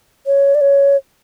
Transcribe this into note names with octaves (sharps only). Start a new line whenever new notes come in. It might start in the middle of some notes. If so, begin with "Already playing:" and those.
C#5
D5
C#5